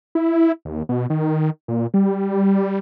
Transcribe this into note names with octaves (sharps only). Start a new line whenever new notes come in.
E4
D#2
B2
D#3
A#2
G3